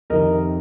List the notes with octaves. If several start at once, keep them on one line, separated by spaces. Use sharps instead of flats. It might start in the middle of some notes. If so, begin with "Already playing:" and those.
F2 C3 D#3 A#4 D#5